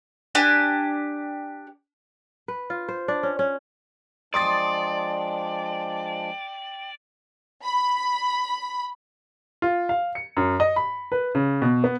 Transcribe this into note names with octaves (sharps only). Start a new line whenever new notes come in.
D4 G4 G#5
B4
F4
C5
D4
C#4
C#4
F3 G#3 D4 D5 G5 C6 D#6 A6
B5
F4
F5
C#7
F#2
D#5
B5
B4
C#3
B2
B3